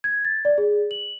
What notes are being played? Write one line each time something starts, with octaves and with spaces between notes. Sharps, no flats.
G#6
A6
D5
G#4
F#7